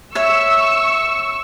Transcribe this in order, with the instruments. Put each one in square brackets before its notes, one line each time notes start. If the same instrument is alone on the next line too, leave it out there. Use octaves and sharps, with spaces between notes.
[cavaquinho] C#5 E5 [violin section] C#6 E6